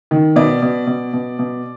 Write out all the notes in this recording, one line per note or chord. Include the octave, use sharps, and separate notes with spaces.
D#3
B2 D5
B2
B2
B2
B2